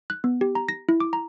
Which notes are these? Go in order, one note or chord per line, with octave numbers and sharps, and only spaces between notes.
F#6
B3
G4
A#5
A#6
E4
D6
A#5